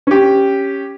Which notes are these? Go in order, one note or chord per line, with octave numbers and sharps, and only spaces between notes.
C#4 G4